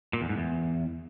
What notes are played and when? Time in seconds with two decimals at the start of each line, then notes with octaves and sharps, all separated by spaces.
0.13 A#2
0.21 E2
0.29 G#2
0.37 E2